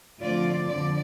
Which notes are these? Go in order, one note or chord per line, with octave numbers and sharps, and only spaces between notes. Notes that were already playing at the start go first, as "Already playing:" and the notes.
D3 F3 A3 C4 F4 D5
F2 D3 F3 D5